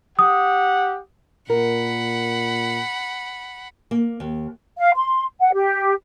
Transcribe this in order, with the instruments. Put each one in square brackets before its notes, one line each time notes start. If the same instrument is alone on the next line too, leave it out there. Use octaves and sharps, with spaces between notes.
[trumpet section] G4 F#5 [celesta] D#6
[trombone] A#2 [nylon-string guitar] A#4 [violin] F#5 B5
[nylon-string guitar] A#3
D#2
[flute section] F5
C6
F#5
G4